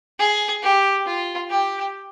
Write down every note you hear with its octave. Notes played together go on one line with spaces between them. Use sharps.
G#4
G4
F4
G4